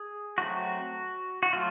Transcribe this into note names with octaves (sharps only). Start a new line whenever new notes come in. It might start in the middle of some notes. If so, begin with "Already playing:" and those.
Already playing: G#4
F#3 A3 C4 F#4
F#4
F#3 A3 F4